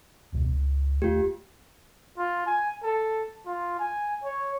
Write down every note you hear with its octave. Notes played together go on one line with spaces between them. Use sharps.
E1 C#2 B2
C#2
D#1 A3 F4 G4
F4
G#5
A4
F4
G#5
C#5